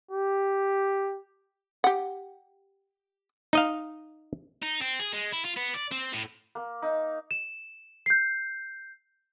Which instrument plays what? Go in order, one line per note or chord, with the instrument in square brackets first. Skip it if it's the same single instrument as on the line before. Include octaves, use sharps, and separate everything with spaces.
[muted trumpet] G4
[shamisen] G4 F#5
[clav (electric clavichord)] D#4 D#5 F5
[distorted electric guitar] D#4
C4
G#4
G#3
E4
F4
B3
D5
C4
A2
[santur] A#3
D#4
[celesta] E7
G6 C7